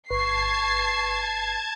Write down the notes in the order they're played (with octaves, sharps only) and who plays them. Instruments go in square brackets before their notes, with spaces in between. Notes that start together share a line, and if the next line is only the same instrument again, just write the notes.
[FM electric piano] G1 B4 [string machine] A5 G#6 [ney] C#6 [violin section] C7